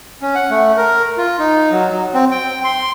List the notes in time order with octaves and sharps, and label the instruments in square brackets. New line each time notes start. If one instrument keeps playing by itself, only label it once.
[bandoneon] C#4
F#5
A3
A#4
F4
D#4
F#3
F#3
C4
G5
C6